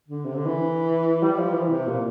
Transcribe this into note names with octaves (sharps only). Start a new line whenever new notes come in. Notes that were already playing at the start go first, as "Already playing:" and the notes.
D3
C3
D3
E3
G3
F3
E3
C3
A#2